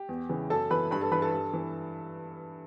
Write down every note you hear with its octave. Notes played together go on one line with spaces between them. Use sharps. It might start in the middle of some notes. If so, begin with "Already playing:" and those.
Already playing: G4
E2
C#3 E3
F#2 A4 A5
E3 B4 B5
G2 B4 B5
A4 A5
E3 B4 B5
A4 A5
G2
E3